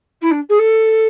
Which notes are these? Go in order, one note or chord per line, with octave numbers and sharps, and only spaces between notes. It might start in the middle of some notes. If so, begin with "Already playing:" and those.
E4
D4
G#4
A4